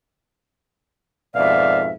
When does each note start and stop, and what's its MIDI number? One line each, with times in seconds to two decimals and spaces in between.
1.35 1.92 41
1.35 1.92 44
1.35 1.92 47
1.35 1.80 74
1.35 1.90 76
1.35 1.90 77